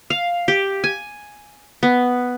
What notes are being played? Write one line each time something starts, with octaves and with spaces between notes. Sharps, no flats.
F5
G4
G#5
B3